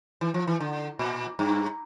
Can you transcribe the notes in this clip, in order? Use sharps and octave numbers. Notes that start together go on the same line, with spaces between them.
E3
F3
E3
D3
A#2
G2